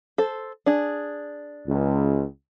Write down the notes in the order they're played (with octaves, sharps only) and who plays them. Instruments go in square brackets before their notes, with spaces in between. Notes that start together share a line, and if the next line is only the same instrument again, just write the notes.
[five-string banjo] A4 C5
D4 G#4
[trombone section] C#2